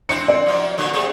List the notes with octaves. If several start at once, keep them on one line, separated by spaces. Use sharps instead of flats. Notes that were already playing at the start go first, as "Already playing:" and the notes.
C4 D4 E4 C#7
D5
F#2 F3 F4
A#2 D3 F#3
C3 A3 G#4